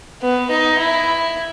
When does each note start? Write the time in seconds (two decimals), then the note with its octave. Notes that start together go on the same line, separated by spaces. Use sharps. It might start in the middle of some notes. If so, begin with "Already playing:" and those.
0.22 B3
0.50 D#4
0.79 E4